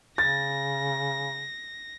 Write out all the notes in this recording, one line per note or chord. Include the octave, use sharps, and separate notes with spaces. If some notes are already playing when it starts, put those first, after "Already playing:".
C#3 A6 A#6